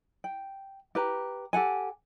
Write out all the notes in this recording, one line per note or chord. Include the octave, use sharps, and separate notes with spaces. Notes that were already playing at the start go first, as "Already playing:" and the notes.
G5
G4 B4 A#5
G4 A4 F#5 G#5